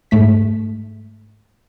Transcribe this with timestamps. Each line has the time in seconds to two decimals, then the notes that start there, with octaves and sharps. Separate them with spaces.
0.11 G#2 A3 B6